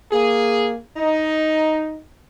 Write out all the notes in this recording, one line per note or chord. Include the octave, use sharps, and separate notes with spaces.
A#3 G#4
D#4